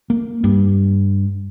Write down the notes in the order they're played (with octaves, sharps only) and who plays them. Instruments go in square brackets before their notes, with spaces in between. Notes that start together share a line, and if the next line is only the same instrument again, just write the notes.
[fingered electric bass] A#3
G2